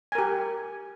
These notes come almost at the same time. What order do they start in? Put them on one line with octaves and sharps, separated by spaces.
G#5 A#4 G4